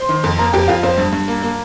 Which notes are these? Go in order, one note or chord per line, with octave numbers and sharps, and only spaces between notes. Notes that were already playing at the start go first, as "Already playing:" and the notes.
Already playing: C5 C6
D#3
F2
A#3 A#4 A#5
F2 G4 G5
F2 F4 F5
F2 C4 C5
G2
G2
A#3
A#3